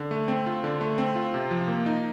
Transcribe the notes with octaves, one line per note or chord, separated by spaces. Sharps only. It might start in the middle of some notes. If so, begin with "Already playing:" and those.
Already playing: D3
A3
C4
F4
D3
A3
C4
F4
C3
F3
A#3
D#4